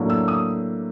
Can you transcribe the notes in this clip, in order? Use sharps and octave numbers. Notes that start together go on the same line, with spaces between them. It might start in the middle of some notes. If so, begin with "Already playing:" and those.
Already playing: A2 F#3 A#3 D4
E6
D#6